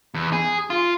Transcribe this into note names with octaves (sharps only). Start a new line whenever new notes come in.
E2
G#4
F4